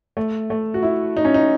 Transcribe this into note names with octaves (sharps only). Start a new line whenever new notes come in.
A3
A3
F#4
E4
D#4
C#4
D#4